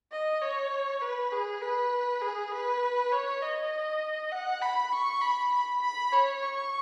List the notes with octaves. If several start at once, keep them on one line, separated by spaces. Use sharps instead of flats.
D#5
C#5
B4
G#4
B4
G#4
B4
C#5
D#5
F#5
B5
C#6
B5
B5
B5
C#5
C#6